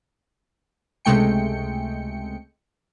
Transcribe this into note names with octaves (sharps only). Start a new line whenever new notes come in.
C#2 C3 G#3 A3 G5 C#7